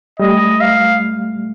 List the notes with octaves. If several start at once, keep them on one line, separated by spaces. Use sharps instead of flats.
G3 A3 D#5
F5